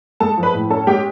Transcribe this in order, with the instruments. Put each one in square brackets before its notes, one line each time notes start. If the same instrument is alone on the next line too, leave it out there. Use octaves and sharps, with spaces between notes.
[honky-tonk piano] G#3 A4 A5
F3
B4 B5
A2
C#4 A4 A5
G#3 G4 G5